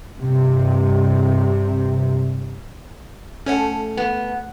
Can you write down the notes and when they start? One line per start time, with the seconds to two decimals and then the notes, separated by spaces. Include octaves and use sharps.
0.18 G2 C3
3.46 A3 C#4 C#5 F#5
3.97 B3